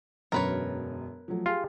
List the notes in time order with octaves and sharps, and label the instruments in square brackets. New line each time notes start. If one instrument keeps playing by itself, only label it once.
[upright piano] E1 F#2 D3 [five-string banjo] A#4 B4 C#5
[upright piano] F3 F#3 A3
[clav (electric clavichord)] F4 [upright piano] G4 G#4